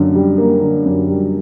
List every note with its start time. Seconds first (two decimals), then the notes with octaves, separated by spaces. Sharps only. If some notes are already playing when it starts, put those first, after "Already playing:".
Already playing: F#2 D3
0.15 G3
0.38 A#3
0.61 D3
0.85 F#2
1.08 G3